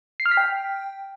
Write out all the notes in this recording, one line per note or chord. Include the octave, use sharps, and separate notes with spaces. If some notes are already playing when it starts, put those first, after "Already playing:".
C7
F6
B6
G5